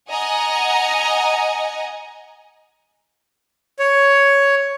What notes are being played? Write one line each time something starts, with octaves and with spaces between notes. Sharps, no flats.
D#5 F#5 G#5 A#5
C#5